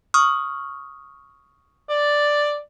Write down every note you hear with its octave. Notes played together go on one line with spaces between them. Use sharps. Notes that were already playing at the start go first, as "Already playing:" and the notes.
C#6 D#6 F6
D5